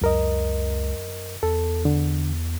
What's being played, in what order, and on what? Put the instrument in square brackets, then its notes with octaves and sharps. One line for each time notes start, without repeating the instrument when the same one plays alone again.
[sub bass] C#2 [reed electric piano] F#2 A#4 D#5
[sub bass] E2 [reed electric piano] A4
[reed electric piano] D3